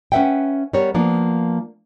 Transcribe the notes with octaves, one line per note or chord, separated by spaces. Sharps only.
C#4 B4 C5 E5 F#5 G5
G3 B3 A#4 C#5
F3 A#3 B3 D4